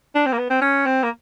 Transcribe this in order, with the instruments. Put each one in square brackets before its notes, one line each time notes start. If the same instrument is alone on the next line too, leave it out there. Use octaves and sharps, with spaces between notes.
[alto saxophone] D4
C4
A#3
B3
C4
C#4
C4
A#3